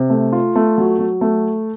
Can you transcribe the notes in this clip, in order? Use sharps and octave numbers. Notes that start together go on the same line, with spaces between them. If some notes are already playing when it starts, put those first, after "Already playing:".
Already playing: C3
A3
F4
A3
F#3
F#3
A3